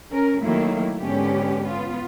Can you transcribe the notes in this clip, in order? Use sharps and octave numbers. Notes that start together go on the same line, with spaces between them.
C#4 A#4
D#3 F#3 A3 A#3 E4
G#2 D3 B3 C#4 G4
B3 F4